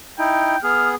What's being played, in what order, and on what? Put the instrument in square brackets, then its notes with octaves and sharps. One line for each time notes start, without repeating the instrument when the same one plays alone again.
[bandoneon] D#4 E4 [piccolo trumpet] G5
[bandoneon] B3 G#4 [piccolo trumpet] F6